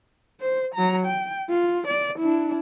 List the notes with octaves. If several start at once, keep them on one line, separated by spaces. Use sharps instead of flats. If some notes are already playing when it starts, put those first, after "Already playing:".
C5
F#3 A#5
G5
F4
D5
D4 E4